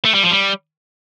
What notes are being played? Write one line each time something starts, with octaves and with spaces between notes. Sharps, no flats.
A3
G3
F3
G3